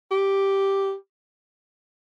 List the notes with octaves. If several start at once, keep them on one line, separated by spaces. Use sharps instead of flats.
G4